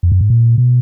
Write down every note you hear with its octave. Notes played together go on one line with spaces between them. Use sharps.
F2
F#2
G#2
A#2
B2